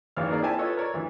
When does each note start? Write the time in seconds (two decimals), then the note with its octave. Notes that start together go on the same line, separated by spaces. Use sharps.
0.17 G#1 E2 E3 C#4 F5 F6
0.29 A#3 C#4 D#4 G#4 A#4 D5
0.42 C4 E4 G4 D5 G#5 A5
0.58 F4 A4 B4 C#5 D#5
0.77 A#4 C#5 D5
0.94 D2 E3